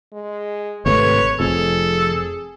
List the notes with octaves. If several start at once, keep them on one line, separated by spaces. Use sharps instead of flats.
G#3
G#1 C3 A3 B4 C#5
F1 F2 G#4 A4